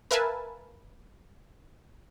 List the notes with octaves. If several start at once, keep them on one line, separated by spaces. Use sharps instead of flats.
A#4 B4 E5 F5 G#5 A5